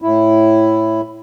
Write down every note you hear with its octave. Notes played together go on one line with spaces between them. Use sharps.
A2 E4